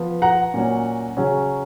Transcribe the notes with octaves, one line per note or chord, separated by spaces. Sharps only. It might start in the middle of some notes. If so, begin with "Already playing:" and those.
Already playing: F3 B3
F#5 A#5
A#2 F#3 C#4
C#3 F#3 C#4